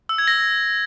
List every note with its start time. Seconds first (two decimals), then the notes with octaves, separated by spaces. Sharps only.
0.09 E6
0.18 G#6
0.27 A#6